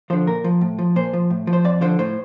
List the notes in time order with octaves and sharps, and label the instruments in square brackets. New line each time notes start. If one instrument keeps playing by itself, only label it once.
[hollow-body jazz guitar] D3 F3 C5
A#2 A#4
F3
A2
F3
A#2 C5
F3
A2
F3
C5
F2 D5
D3 F3 C5
A2 C5